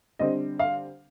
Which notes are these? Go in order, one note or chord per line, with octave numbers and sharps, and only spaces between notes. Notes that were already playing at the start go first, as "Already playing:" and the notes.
D3 G3 C4 D#5
F5